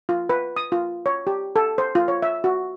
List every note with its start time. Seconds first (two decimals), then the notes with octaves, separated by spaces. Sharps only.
0.09 F4
0.29 B4
0.56 D#6
0.72 F4
1.06 C#5
1.27 G4
1.56 A4
1.78 C5
1.95 F4
2.08 C#5
2.22 E5
2.44 F#4